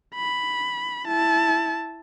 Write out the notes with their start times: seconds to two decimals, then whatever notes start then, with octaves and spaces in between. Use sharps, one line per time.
0.16 B5
1.07 E4 A5